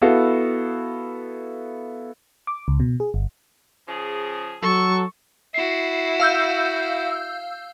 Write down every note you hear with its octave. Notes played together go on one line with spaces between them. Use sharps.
B3 E4 F#4 A4 F5
D6
C#2
B2
G#4
G1
C#3 F3 G#4
F#3 A4 C#6
E4 F#4 C7
F5 E6 G6